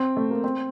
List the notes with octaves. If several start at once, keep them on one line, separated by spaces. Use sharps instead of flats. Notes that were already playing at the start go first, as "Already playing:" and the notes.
Already playing: C4
A3
A#3
C4